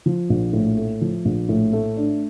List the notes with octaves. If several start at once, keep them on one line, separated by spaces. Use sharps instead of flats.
F3
A#1
A2
A3
F3
A#1
A2
A3
D4